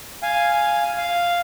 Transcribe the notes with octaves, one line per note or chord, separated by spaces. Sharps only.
F5 G#5
F5